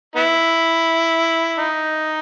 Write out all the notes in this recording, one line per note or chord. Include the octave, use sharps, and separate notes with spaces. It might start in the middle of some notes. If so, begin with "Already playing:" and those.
B3 E4
D#4